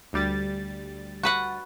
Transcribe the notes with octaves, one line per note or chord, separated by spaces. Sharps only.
D2 G3 A6
F#4 B4 F#5